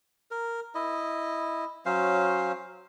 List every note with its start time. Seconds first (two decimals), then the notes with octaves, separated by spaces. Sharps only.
0.31 A#4
0.75 E4 D#5
1.86 F#3 C#4 C5 F5